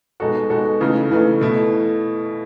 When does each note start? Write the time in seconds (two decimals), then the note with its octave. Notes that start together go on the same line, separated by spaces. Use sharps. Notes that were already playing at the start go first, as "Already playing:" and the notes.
0.20 B2 G#3 D#4 F#4 A4
0.50 B2 G#3 D#4 F#4 A4
0.80 C#3 E3 A3 D#4
1.11 C#3 E3 A3 D#4
1.41 B2 A3 E4